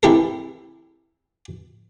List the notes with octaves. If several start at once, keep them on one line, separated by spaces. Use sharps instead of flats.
E3 C4 E4 G4 A4 A#4